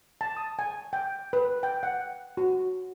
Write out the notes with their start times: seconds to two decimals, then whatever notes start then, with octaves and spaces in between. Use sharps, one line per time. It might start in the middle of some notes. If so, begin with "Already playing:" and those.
0.21 A5
0.37 D#6
0.59 G#5
0.93 G5
1.33 B4
1.63 G5
1.83 F#5
2.37 F#4